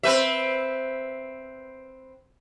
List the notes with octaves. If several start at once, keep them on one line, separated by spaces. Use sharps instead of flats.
C4 B4 E5